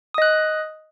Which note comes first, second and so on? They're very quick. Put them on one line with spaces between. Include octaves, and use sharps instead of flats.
D#6 D#5 F#6